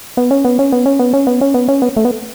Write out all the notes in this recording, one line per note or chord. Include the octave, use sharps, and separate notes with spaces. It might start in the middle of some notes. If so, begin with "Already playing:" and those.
B3
C#4
B3
C#4
B3
C#4
B3
C#4
B3
C#4
B3
C#4
B3
A3
B3